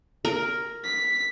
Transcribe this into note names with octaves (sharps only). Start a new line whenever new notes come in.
A#4
B6